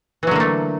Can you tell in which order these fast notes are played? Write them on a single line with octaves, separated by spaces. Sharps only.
E3 F#3 D3 A#3 A3